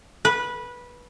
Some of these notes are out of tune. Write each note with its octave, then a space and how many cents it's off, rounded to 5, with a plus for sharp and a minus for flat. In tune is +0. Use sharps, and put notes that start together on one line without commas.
B4 -15